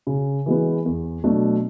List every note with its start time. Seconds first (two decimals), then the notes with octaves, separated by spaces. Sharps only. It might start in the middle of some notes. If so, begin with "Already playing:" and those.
0.07 C#3
0.46 E3 G#3 B3
0.86 E2
1.24 B2 F#3 A3 D4